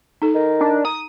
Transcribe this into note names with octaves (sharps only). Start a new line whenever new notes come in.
D#4 A4
D#3
D4
A#5 D#6